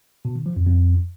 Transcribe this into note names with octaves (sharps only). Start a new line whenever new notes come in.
B2
D#3
F3
F2
F2